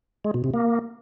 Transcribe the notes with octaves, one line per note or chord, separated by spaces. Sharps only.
G#3
B2
C3
A#3